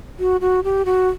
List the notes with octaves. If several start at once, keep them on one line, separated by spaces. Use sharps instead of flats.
F#4
F#4
G4
F#4